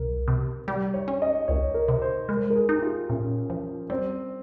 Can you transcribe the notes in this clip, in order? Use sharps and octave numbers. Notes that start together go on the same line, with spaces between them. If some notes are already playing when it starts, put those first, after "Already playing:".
Already playing: C2 A#4
C3
G3 G4
C#5
C#4
D#5
C#2 C#5
A#4
C3
C5
G#3 A#4
A#4
G#4
D#4
G4
F4
A#2 C#4
F3
G3 C4